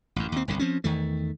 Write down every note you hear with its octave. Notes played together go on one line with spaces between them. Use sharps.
A1 F#2
D#2 C4
G1 C2 D3
F3 C4 C#4
E2 D#3 A3